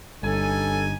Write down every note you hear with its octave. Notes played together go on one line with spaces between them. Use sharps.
G1 G2 C#4 D#4 A4 G#5